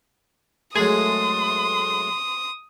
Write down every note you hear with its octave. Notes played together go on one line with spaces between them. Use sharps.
F#2 G#3 A3 G#4 C6 D#6